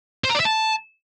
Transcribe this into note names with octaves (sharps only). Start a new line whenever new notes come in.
C5
A#5
D5
E5
A5